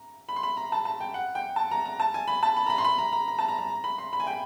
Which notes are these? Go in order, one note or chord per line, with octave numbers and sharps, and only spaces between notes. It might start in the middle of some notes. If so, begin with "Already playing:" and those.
Already playing: A#5
B5
C6
B5
A#5
A5
A5
G5
F#5
G5
A5
A#5
A#5
A5
G#5
B5
A5
B5
A#5
B5
C6
B5
A#5
A#5
A#5
A5
A#5
A#5
A#5
B5
C6
B5
G#5
G5